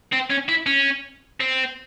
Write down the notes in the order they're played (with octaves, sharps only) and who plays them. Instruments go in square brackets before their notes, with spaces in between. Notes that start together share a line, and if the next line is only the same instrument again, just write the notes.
[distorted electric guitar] C4
C#4
E4
C#4
C4